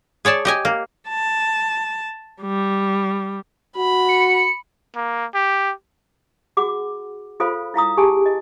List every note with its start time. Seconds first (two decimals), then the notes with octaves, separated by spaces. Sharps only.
0.25 G#4 C#5 D5 A5
0.45 G4 D#5 G#5
0.65 A#3
1.09 A5
2.42 G3
3.78 F#4 B5
4.09 C#7
4.95 A#3
5.34 G4
6.57 F#4 G#4 F#5 D6
7.40 F4 A4 C5 F5 B5
7.74 E4 F5 A#5 D#6
7.97 G4 G#4 G#5 A5
8.26 D#5